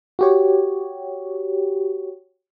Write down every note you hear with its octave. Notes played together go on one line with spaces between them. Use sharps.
F#4 G4 C#5